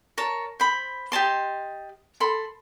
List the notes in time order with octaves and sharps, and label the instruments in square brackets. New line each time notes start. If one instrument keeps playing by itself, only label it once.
[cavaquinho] A#4 C#5 A5
C5 B5
G4 D#5 A5 C6
A4 B5 C6